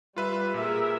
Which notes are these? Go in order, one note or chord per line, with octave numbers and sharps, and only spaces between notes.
G3 F4 B4 E5
A#2 G#4 A#4 E5